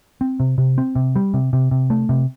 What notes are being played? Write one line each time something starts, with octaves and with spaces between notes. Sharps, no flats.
C4
C3
C3
C4
C3
G3
C3
C3
C3
A3
C3